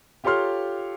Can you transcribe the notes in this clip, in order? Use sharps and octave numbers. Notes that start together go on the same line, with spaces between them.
F4 G4 A4 C#5 C6 F6